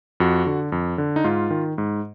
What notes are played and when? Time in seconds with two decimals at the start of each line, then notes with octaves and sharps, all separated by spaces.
0.20 F2 F#4
0.47 D3
0.72 F2
0.98 D3
1.16 D#4
1.24 G#2 F4
1.51 D#3
1.78 G#2